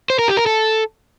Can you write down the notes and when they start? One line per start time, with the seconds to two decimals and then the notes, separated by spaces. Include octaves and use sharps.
0.10 C5
0.19 A#4
0.28 G4
0.37 A#4
0.46 A4